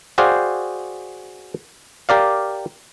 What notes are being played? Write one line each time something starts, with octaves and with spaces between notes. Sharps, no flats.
F#4 G#4 C5 D5 F5 G5
G4 A#4 D5 F5